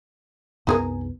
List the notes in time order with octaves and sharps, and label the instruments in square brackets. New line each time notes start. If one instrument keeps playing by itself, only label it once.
[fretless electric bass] C2 F#2 B3 [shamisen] D#4 G#4 A#4